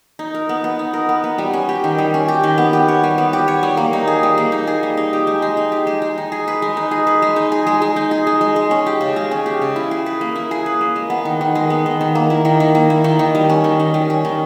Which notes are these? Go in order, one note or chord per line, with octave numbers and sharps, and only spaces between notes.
D#4
A#4
B3
B3
D#4
A#4
B3
B3
G3
C#4
G4
D#3
G3
C#4
G4
D#3
B3
G4
C#5
G3
B3
G4
C#5
G3
A#3
D#4
G#4
G3
A#3
D#4
G#4
G3
D#4
G4
G#3
G#3
D#4
G4
G#3
G#3
D#4
G#4
B4
G#3
D#4
G#4
B4
G#3
D#4
G#4
G#3
G#3
D#4
G#4
G#3
G#3
G#3
C#4
G4
C#3
G#3
C#4
G4
C#3
E4
G#4
B4
A#3
E4
G#4
B4
A#3
G#3
B3
D#3
D#3
G#3
B3
D#3
D#3
A#3
E4
D#3
D#3
A#3
E4
D#3
D#3
G3
C#4
D#3
D#3
G3
C#4
D#3